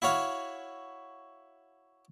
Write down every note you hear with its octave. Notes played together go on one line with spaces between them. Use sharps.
E4 F#4 C#5 F5